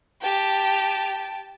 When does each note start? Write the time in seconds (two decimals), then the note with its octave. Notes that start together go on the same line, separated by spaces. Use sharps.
0.22 G4 G5 A5